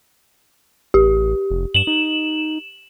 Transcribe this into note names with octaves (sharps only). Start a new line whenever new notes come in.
A1 G4
F1
G2 E7 F#7
D#4